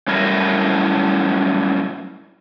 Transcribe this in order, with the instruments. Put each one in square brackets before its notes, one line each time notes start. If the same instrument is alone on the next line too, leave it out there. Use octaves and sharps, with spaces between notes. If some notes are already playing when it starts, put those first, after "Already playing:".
[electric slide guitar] F#2 A2 G3 E4 A#4 B4